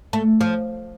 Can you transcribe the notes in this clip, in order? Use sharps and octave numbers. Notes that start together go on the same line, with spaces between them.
A3
F3